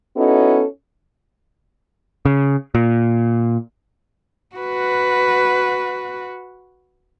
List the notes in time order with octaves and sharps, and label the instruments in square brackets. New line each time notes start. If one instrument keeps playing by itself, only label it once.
[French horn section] B3 C#4 D#4 E4 F#4 A4
[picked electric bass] C#3
A#2
[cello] F#4 B4